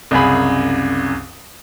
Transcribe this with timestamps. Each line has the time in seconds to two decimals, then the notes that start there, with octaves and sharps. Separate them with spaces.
0.11 C2 F#2 C#3 G#4 B5